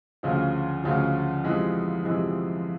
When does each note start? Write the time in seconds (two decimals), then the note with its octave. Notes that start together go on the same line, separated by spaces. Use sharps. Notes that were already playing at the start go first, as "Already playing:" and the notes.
0.23 D2 C#3 F3
0.84 D2 C#3 F3
1.44 F2 C3 E3 G#3
2.05 F2 C3 E3 G#3